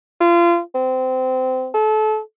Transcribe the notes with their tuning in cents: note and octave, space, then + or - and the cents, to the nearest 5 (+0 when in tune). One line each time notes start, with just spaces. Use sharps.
F4 -30
C4 -20
A4 -30